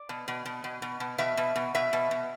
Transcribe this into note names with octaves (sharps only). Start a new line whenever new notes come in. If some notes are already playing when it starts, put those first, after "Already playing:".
Already playing: D5
B2
B2
B2
B2
B2
B2
B2 E5
B2
B2
B2 E5
B2
B2